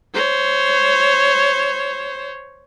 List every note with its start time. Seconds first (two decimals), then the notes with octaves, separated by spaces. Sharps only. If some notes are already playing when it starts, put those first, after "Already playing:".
0.14 C5 C#5